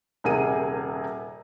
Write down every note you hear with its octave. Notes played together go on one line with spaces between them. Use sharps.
D#1 C3 G#4 A#4 F#5 D#7